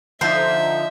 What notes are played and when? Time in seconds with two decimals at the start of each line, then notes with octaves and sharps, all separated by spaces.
0.21 D3 F3 D#4 C5 E5